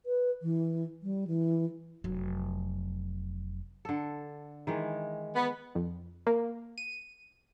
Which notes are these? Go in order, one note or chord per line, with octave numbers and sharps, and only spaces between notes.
B4
E3
G3
E3
F1 F#3
D3 A4
D#3 E3 G#3
B3
F2
A#3
D#7